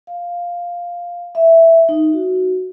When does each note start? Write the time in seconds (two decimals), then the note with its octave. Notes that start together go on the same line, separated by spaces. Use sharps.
0.07 F5
1.35 E5
1.89 D#4
2.13 F#4